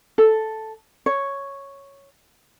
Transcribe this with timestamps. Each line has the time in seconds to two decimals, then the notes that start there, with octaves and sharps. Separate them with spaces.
0.18 A4
1.06 C#5